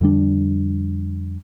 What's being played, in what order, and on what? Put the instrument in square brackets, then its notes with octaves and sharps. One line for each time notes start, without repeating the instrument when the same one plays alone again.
[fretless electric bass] F2 D3 G3 D4